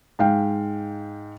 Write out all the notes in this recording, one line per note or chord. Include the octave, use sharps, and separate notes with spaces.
G#2 F5 G5